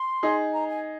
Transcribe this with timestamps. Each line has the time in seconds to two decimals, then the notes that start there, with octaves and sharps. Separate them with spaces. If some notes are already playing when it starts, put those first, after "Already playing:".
Already playing: C6
0.23 D#4 G#4
0.53 A#5
0.69 G#5